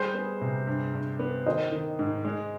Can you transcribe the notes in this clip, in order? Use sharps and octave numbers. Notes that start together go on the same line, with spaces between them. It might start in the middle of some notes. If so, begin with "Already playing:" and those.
Already playing: G3 G#4 C5
B3
C3
G2
G2
B3
D#3 C5 D#5
D#3
G#2
G#3